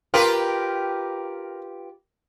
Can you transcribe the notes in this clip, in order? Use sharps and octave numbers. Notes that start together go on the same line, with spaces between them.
F4 G4 A#4 B4